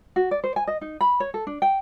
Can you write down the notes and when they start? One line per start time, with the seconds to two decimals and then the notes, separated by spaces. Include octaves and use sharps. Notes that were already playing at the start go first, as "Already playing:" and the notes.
0.16 F#4
0.31 D5
0.44 C5
0.56 G#5
0.67 D#5
0.81 D#4
1.01 B5
1.20 C#5
1.34 A4
1.47 D4
1.62 G5